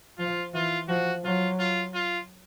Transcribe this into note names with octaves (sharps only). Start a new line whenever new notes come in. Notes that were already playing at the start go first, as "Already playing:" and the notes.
F3 F4
E3 F4
F3 F#4
F#3 F4
F4
F4